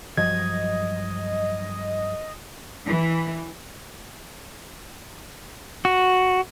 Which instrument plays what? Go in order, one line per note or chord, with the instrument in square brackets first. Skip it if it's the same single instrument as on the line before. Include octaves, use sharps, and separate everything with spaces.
[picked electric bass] G2 F3 F#3 [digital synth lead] D#5 [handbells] G#6
[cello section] E3
[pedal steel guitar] F#4